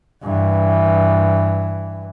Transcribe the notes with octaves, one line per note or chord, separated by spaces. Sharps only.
G2 E3